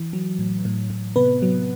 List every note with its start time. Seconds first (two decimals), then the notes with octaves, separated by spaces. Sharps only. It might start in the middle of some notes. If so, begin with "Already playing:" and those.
Already playing: E3
0.13 F#3
0.39 A2
0.65 A2
0.90 A2
1.16 C3 B3 B4
1.42 F#3